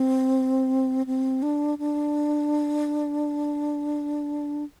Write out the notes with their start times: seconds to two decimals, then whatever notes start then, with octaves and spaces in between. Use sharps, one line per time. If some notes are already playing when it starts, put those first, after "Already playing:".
Already playing: C4
1.06 C4
1.42 D4
1.79 D4